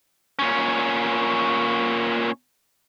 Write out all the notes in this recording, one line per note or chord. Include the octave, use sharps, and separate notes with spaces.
A#2 C#4